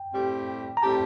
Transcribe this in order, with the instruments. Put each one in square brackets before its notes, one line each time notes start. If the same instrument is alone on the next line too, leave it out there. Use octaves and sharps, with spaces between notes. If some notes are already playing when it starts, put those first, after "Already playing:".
Already playing: [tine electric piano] G5
[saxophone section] A2 G3 C4 G4
[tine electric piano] A#5
[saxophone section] A2 G3 C4 G4 [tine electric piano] A5